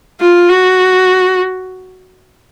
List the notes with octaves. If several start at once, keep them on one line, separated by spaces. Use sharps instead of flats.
F4
F#4